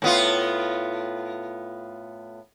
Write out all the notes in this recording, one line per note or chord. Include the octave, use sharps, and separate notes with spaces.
A2 B3 F4